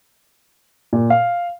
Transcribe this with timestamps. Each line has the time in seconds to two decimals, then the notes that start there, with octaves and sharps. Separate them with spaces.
0.93 A#2
1.10 F5